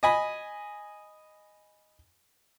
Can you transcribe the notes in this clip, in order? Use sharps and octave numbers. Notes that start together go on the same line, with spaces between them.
D#5 G#5 B5